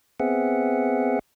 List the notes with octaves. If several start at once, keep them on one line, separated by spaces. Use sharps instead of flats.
B3 C4 G#4 E5 F#5